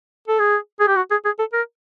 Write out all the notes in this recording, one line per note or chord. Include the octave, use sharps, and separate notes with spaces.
A4
G#4
G#4
G4
F#4
G#4
G#4
A4
A#4